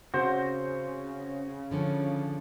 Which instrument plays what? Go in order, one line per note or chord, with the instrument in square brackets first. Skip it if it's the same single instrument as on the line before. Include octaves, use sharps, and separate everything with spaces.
[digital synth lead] C#3 [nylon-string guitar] C4 [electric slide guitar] F#4 C5
[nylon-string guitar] D3 F3 C#4